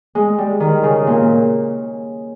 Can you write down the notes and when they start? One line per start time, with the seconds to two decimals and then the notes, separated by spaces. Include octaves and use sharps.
0.15 G#3
0.38 G3
0.60 D#3
0.83 C#3
1.07 A#2